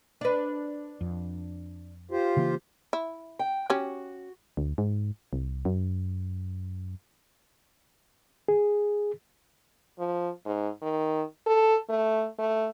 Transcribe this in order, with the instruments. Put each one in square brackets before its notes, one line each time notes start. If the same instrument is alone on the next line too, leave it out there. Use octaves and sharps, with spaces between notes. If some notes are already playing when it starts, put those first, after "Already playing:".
[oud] D4 B4
[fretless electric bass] F2
[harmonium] F4 G4 C5
[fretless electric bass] C#3 E3 A#3
[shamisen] E4
[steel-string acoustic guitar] G5
[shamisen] C#4 G4 [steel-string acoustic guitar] F#4
[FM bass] D2
G#2
C2
F#2
[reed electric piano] G#4
[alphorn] F3
G#2
D#3
A4
A3
A3